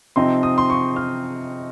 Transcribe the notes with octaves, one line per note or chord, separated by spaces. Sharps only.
C3 F3 C4 D#4 C6
D#6
C6
C#6
F6